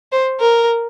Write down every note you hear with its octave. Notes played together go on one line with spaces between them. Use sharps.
C5
A#4